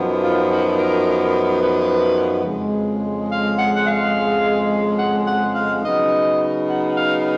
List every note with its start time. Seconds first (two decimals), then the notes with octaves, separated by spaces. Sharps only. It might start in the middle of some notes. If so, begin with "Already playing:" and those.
Already playing: F#2 F3 B3 D#4
0.20 F4
0.48 F#4
0.76 A#4
1.61 B4
2.45 F2 C#3 G#3
3.29 F5
3.58 F#5
3.74 F#5
3.85 F5
4.98 F#5
5.26 F#5
5.54 F5
5.81 C#3 F#3 B3 D#4 D#5
6.66 F#5
6.94 F5